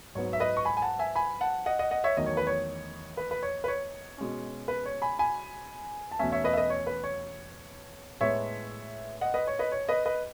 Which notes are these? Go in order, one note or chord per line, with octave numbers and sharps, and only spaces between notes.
G#2 F#3 B3 C#5
E5
B4 D#5
C#6
G#5 B5
G#5
F#5 A5
E5 G#5
G#5 B5
F#5 A5
D#5 F#5
D#5 F#5
D#5 F#5
C#5 E5
E2 D#3 F#3 A3 D#5
C#5
B4
C#5
B4
B4
C#5
B4
C#5
B2 G#3 C#4
B4
C#5
G#5 B5
G#5 B5
A5
E2 B2 A3 C#4 E5 G#5
C#5 E5
B4 D#5
E5
B4 D#5
C#5
B4
C#5
A2 G#3 B3 C#5 E5
D#5 F#5
B4 D#5
C#5
B4 D#5
C#5
B4 D#5
B4 D#5